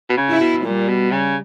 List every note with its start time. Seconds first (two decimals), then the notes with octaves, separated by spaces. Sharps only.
0.09 B2
0.17 C#3
0.29 E4
0.40 B2
0.64 A#2 G3
0.88 B2
1.12 C#3